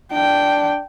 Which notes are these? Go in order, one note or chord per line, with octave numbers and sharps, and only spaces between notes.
D4 G5